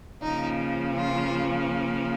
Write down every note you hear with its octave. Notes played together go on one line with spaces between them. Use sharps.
C#3 F3 A#3 D#4
F4